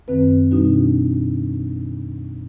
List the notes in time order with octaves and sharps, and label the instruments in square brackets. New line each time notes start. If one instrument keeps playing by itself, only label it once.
[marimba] F#2 D#3 C4 B4
B2 G3 D4 D#4 F#4